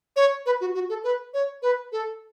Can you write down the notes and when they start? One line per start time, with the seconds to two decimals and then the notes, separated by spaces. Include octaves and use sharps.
0.16 C#5
0.46 B4
0.61 F#4
0.75 F#4
0.89 A4
1.04 B4
1.34 C#5
1.62 B4
1.92 A4